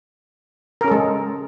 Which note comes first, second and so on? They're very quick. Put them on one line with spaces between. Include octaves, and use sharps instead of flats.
A#4 C#4 A4 G#3